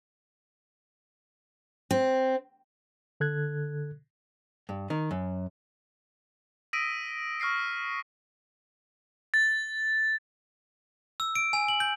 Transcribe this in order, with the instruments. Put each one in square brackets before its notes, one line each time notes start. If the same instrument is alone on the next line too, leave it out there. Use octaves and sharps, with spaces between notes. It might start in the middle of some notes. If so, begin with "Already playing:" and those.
[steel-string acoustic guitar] C4
[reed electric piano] D3 A4 F#6 G#6
[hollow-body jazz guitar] G2
D#3
F#2
[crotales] D#6 E6 A#6 B6 D7 D#7
C#6 F6 A#6 C7 D7
A6
[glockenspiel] E6
D7
G#5
F#7
G6